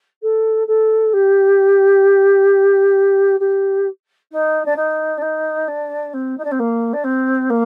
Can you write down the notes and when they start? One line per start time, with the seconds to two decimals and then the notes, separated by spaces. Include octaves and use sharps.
0.22 A4
0.67 A4
1.13 G4
3.40 G4
4.32 D#4
4.65 D4
4.76 D#4
5.18 D4
5.22 D#4
5.68 D4
6.14 C4
6.37 D#4
6.44 D4
6.51 C4
6.59 A#3
6.93 D4
7.04 C4
7.50 A#3